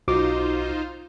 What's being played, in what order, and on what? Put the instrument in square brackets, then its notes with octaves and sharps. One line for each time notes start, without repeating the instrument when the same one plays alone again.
[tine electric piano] B1 F#4 D6 [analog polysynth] D#4 F4 C5